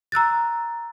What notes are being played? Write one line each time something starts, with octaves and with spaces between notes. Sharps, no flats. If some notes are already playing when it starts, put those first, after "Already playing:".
A#5 E6 F#6 A6